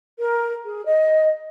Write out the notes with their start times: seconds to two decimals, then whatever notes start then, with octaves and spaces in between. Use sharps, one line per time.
0.19 A#4
0.65 G#4
0.86 D#5